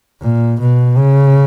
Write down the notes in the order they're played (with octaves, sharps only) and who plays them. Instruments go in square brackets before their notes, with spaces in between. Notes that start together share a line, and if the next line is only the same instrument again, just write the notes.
[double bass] A#2
B2
C#3